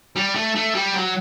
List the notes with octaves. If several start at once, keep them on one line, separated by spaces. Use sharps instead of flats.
G3
A3
A3
G3
F#3